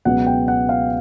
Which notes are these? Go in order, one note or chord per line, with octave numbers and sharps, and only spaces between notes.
C#2 B2 F#3 B3 F#5
G5
F#5
F5